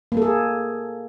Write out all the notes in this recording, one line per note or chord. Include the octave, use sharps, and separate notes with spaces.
A#3 G#4 A4